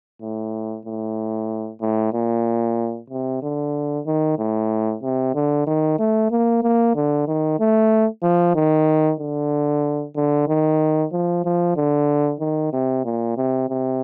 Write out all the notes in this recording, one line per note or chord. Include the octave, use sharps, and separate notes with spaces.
A2
A2
A2
A#2
C3
D3
D#3
A2
C3
D3
D#3
A3
A#3
A#3
D3
D#3
A3
F3
D#3
D3
D3
D#3
F3
F3
D3
D#3
C3
A#2
C3
C3